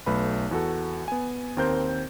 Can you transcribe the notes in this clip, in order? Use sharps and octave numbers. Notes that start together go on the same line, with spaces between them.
B1 A3 B4 B5
E2 F#4 A4
B3 G#5
D#2 C4 A#4 C5 G6